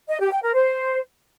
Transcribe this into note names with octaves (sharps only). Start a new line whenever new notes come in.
D#5
G4
G5
A#4
C5